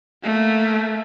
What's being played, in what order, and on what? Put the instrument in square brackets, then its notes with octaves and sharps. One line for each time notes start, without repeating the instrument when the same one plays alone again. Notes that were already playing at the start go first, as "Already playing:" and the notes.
[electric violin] A3 A#3